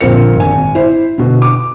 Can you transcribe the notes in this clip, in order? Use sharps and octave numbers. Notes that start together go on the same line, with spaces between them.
A#1 A#2 D3 C4 A#4 C#7
G#1 G#5
E4 C5
B2 D3
D6